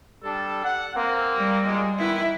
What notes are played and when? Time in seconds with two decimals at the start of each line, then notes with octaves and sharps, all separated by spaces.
0.23 G3 D4 A4
0.64 F#5
0.95 A#3 C4
1.36 G3
1.65 A#2 G#3
1.99 D#3 E3 B3 E4